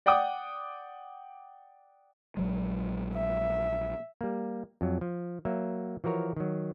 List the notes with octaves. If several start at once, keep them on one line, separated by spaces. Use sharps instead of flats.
D5 F#5 G5 D6 D#6
A#1 F#3 G#3
E5
G3 A#3
F2 F#3
F3
F#3 A#3 E5
E3 F3 F#4 A#4 C#5
D#3 F#3